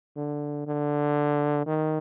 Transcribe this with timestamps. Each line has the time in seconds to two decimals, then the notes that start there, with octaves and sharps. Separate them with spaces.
0.16 D3
0.67 D3
1.66 D#3